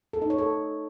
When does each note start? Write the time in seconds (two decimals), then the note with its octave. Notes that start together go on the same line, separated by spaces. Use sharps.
0.13 A4
0.22 D#4
0.30 C#5
0.38 A4